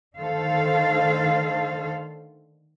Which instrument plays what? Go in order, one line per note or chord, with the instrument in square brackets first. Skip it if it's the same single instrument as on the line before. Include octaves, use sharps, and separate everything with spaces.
[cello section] D3 D#3 A3 A4 C5 F5